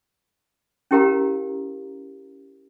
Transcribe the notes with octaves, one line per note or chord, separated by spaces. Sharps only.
C#4 E4 G4 A#4 F5 A#5